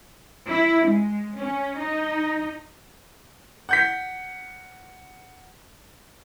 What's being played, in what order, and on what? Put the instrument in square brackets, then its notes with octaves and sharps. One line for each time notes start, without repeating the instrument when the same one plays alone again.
[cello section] E4
G#3
C#4
D#4
[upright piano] F#5 G6 B6